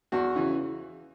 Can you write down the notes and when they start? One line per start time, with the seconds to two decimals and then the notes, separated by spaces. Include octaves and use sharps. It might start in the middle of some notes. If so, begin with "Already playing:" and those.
0.12 E2 F#4
0.35 C#3 E3